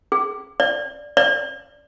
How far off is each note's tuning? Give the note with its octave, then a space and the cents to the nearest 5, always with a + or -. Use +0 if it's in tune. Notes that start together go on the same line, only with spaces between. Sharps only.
G#4 +5
D5 -5
D5 -10